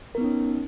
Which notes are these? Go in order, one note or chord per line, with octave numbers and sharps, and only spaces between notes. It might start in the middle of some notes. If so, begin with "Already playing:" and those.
B3 C#4 D#4 A#4